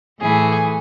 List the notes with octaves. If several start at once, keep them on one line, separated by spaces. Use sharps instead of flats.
A2 E3 A3 G#4